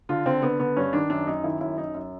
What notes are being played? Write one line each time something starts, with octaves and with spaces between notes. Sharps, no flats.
D3 F4
D3 C4
D3 B3
D3 B3
G2 C#4
D#3 D4
F#2 D4
F#2 D#4
D#3 E4
F#2 E4
F#2 D#4
F#2